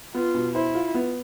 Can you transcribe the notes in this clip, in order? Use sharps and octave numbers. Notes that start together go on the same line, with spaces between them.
B3 F4
B2
E4 C5
F4
B3